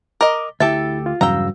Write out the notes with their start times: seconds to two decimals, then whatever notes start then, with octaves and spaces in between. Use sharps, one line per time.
0.21 A#4 D#5 D6
0.60 D2 E4 G4 A4 E5 A6
1.06 F4
1.21 E2 G2 C#3 F#3 F5 G5 A#5 E6